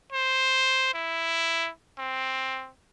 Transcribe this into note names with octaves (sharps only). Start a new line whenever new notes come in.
C5
E4
C4